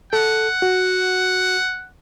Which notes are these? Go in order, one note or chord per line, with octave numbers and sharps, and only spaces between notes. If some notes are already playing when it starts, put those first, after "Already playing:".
A4 F#5
F#4